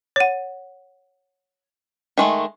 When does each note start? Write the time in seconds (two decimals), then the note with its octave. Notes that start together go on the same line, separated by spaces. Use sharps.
0.16 C#5 F#5
2.18 D#3 G#3 A3